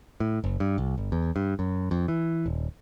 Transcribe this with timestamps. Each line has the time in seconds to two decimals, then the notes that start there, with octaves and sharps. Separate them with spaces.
0.20 A2
0.44 F#1
0.60 G2
0.78 C2
0.98 G1
1.12 E2
1.36 G2
1.59 F#2
1.91 F2
2.08 E3
2.46 D#1